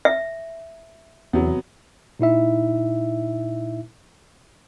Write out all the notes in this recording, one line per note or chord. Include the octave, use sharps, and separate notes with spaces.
E5
E2 C3 F#3 B3
A#2 D#4 E4 E5